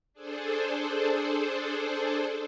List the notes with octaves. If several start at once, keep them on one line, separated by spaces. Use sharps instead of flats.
D4 G#4 A4 C5